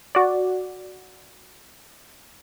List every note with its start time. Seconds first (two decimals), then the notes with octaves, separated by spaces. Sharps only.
0.15 F#4 D5